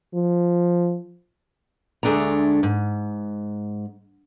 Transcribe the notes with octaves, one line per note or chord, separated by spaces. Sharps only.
F3
D2 G#3 A3 D4 A4 A#5
G#2